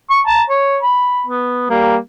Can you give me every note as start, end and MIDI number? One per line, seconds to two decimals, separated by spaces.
0.10 0.21 85
0.27 0.42 81
0.27 0.42 82
0.49 0.78 73
0.83 1.25 83
1.26 1.65 59
1.69 1.96 55
1.69 1.96 58